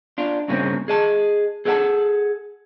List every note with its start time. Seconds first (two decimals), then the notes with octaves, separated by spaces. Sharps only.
0.18 D4 F4
0.48 G2 A#2 C#3 A#3 C4 C#4
0.88 G#4 D#5 A5
1.65 G#4 A4 D5 F5 F#5 A5